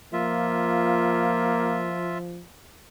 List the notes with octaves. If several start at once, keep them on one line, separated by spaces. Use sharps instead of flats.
F3 A#3 F4 E5